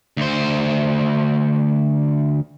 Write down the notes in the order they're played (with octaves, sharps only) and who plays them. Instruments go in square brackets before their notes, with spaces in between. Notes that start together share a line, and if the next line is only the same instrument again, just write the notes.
[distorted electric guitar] D2 C5